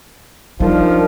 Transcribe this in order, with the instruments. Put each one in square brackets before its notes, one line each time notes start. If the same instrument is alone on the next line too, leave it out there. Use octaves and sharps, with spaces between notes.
[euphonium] F3 [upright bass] G3 [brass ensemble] D4 D#4 [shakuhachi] A#4